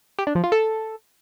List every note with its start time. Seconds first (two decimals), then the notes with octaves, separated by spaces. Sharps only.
0.19 G4
0.27 D4
0.35 F3
0.44 F4
0.52 A4